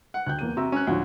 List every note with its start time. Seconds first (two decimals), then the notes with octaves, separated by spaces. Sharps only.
0.14 F#5
0.26 D2 G5 F#6 G6
0.39 E2 A#3 D#7
0.57 C3 F#4 A#5 E6
0.72 C#4 F#6
0.87 D2 A2 F3 F#4